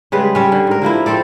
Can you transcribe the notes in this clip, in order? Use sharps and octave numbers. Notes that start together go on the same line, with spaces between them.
C#3 G3 G#3 B4
G3 C#4
D3
G#2 A#4
D3 F3 A#3 E4
F3 C4 A4 D5